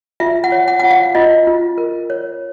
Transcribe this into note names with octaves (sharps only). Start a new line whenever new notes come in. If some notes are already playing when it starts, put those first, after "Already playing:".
F4 E5
F#5
C#5
F#5
F4 F#5
F5
F4 D#5
F4
A#4
C#5